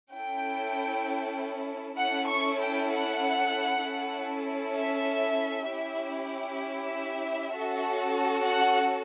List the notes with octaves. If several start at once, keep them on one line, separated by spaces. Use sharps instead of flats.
C#4 E4 A4 G5
C#4 E4 A4 F#5
C#6
G5
F#5
C#4 E4 A4
E5
C#4 E4 G4
E5
C#4 F#4 A4
F#5